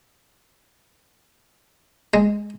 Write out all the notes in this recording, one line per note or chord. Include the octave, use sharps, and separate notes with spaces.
G#3